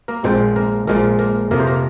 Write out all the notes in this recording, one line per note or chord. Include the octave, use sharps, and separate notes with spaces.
A#3 A#4
A#1 A#2 F3 G#3 C4 C5
A#3 A#4
A#1 A#2 F3 G#3 A#3 A#4
A#3 A#4
F2 C3 F3 A#3 A#4
C5
A#3 A#4